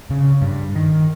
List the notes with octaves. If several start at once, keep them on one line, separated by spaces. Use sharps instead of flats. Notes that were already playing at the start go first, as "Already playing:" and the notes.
C#3
G2
D#3